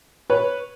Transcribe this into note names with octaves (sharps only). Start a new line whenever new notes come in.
B4 C#5